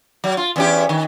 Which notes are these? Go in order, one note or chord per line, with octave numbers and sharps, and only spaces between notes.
F#3
F4
E2 C#4 G4
D#3